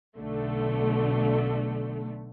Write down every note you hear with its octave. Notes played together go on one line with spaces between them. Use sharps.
B1 D3 A3